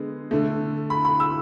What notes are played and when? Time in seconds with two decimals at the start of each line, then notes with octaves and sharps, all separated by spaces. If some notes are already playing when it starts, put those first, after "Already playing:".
Already playing: D3 G#3 B3
0.31 D3 A3
0.90 B5
1.05 B5
1.20 E6